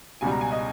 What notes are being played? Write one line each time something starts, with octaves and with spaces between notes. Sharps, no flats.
C#2 B2 G3 G#5
A#5
G#5
D#5